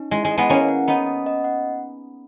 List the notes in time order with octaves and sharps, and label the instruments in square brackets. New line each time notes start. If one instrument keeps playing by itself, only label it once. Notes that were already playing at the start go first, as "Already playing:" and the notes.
Already playing: [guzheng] C#4 [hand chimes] D#4
[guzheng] G#3 [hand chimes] E4
[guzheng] G#3
[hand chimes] D#5
[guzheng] G#3 B3
[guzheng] A#3 C#4 [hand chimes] E4
[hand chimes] F#5
[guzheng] B3 D#4 [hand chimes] D#5
[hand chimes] F#5
D#5
F#5